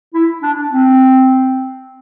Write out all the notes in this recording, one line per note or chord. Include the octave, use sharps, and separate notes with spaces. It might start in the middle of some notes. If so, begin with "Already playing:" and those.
E4
D4
C4